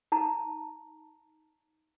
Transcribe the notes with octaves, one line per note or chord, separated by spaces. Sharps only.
D#4 A5 A#5